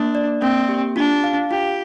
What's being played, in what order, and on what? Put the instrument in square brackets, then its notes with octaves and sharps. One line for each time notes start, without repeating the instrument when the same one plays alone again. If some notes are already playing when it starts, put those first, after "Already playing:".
Already playing: [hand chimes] A#3 [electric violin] D4
[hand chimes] D5
[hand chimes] A#3 [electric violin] C4
[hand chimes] G4
[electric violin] D4 [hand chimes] F4
[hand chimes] F5
[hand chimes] F4 [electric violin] G4